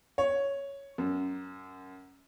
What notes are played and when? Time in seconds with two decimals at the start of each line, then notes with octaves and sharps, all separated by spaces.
0.18 C#5
0.98 F#2